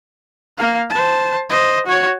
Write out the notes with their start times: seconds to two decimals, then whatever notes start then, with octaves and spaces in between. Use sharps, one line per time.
0.58 A#3 F5
0.90 C5 A5
1.50 C5 D#5
1.86 F#4 C#5